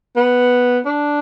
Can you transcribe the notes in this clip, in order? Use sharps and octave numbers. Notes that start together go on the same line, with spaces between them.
B3
D4